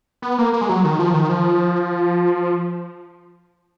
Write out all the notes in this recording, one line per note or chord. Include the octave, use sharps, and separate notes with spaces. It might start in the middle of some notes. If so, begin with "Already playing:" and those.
B3
A#3
A#3
G#3
F#3
D#3
F3
D#3
F3